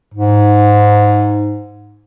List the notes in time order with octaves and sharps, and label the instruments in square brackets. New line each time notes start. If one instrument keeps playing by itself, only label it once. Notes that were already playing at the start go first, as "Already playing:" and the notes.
[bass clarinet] G#2